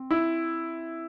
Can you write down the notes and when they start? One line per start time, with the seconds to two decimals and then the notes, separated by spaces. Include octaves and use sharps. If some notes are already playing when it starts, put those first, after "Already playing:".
Already playing: C4
0.11 E4